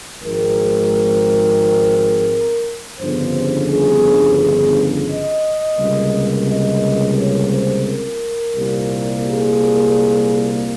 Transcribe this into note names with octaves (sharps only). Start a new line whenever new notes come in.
G#1 G#2 F3 G#3 C4 A#4
G1 F2 C#3 C5
G#4
D#5
C#2 C3 G3 A#3
D#5
C#5
C5
A#4
C2 A#2 G3 A#3
G#4